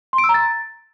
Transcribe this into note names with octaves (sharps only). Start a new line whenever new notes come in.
C6
D7
E6
A#5
A6